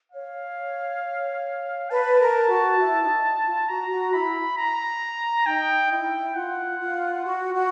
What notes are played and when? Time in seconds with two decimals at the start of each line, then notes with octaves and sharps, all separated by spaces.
0.12 C#5 F5
1.90 B4 A5
2.20 A#4
2.50 F#4
2.79 E4
3.02 D#4
3.46 F4
3.68 F#4 A#5
3.91 F#4
4.13 E4 B5
4.58 A#5
5.46 D#4 G5
5.91 E4 G5
6.35 F4 F#5
6.80 F4
7.25 F#4
7.54 F#4